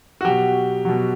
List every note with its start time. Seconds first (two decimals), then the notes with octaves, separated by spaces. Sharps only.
0.21 F#4
0.25 B2 F#3 G4
0.85 B2 F#3